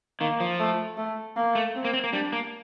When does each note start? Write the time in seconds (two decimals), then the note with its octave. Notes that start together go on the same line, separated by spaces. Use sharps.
0.20 D#3 A#3
0.40 F3
0.59 A3
0.97 A3
1.36 A#3
1.55 A3
1.75 C4
1.85 A#3
1.94 C4
2.04 A#3
2.12 G3 D4
2.33 A#3